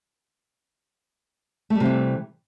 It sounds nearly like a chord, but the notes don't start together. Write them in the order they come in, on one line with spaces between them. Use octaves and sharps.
A3 G3 C3 E3